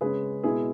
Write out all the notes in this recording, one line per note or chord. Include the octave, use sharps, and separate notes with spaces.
C#3 G#3 C#4 G#4 B4
B2 G#3 B3 E4 G#4